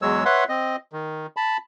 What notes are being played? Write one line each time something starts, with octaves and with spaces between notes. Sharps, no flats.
E2 F#3 G#3 C#5 E6
B4 C#5 E5 F#5 C6
C4 D#5
D#3
A5 B5